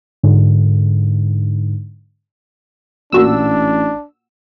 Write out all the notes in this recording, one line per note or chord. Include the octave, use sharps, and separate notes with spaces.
G#2 D3
A1 A#2 D4 F#4 E6